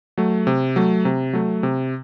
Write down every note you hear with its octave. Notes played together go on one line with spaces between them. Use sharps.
F#3 A3
C3
F#3 A3
C3
F#3 A3
C3